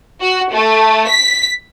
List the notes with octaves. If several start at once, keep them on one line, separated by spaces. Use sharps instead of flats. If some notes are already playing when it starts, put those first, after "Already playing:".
F#4
A3
B6